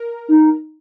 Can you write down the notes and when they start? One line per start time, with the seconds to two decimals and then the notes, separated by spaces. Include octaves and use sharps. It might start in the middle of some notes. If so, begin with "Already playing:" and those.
Already playing: A#4
0.28 D#4